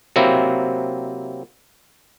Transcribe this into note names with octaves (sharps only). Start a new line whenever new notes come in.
C3 F#3 A#3 C4 E4